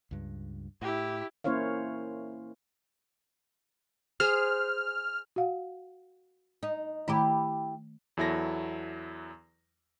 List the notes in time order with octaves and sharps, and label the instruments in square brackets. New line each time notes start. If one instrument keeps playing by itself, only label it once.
[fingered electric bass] C#2 G2
[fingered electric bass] A2 [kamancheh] E4 G4
[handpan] A#3 C#4 E4 C5 C#5 F5
[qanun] G#4 C5 [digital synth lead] F6
[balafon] F#4 F5 F#5
[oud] D#4
[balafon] D#3 A3 A#5 [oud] E4 G4
[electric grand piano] E2 F#3 E4 A4 A#6